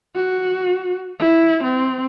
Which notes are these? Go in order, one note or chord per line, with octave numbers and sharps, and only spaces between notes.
F#4
E4
C4